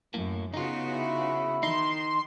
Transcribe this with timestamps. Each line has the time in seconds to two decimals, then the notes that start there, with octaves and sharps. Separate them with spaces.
0.14 F#2 A2 A#3
0.54 C#3 B3 D#4 F4 F#4
0.93 E4
1.63 D#3 D#4 C6